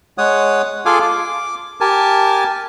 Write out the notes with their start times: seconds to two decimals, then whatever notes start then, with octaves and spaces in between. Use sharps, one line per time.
0.18 G#3 C#5 F#5 D#6
0.86 F4 G#4 A4 F5 G#5 D6
1.02 D6
1.81 G4 A#4 G#5 A5